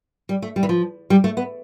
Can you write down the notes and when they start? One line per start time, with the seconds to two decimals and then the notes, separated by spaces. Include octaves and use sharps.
0.29 G3
0.42 A3
0.56 G3
0.63 E3
0.69 F3
1.10 G3
1.24 A3
1.37 B3